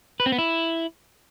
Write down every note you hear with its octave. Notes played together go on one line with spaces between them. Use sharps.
B4
C4
B3
E4